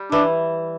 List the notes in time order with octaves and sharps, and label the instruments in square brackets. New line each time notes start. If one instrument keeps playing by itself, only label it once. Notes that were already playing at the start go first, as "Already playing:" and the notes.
Already playing: [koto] G3
[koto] E3 [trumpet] D4